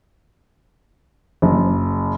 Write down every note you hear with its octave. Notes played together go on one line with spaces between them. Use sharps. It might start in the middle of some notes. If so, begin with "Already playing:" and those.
F#1